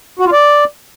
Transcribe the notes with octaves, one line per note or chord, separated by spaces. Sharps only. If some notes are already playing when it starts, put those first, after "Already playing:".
F#4
F4
D5